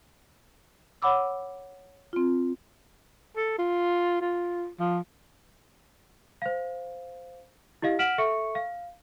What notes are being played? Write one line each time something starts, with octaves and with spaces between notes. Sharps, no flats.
C#5 F#5 B5 D6 E6
C4 F4
A4
F4
F4
F3
C5 F5
E4 G4 D#5 F5
F#5 F6 B6 D7 E7 F#7
A4 E5 C#6 C#7
F5